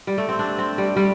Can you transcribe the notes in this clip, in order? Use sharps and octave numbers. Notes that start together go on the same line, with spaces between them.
G3
A3
C4
D4
C4
G3
G3